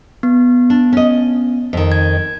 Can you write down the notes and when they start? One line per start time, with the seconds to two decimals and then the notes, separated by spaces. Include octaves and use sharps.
0.23 B3
0.70 D4
0.93 C#4 D#5
1.73 F2 D#3
1.92 G#6